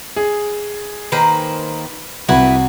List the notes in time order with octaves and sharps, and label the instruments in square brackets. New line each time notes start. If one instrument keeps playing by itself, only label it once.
[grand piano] G#4
[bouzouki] D#3 A#3 C5 [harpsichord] B4
[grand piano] C2 [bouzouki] E4 B4 [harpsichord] F#4